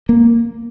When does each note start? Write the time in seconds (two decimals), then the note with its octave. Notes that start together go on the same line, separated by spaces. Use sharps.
0.09 A#3